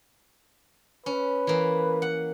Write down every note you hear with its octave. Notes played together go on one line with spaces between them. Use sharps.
C#4 B4
E3 A#3
F#5